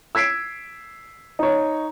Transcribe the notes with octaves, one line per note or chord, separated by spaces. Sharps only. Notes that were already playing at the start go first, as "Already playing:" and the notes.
E6 G#6 B6 C7 D7
D#4 C#5